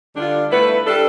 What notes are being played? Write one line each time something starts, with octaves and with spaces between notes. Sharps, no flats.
D3 G3 D4 F4
A3 E4 B4
G3 D4 A4